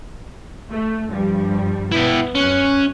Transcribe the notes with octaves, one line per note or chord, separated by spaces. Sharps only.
A3
G2 F3 G3
B3 E4 G5
F#2 C#4 F#6